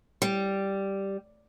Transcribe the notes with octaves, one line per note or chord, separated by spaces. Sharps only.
G3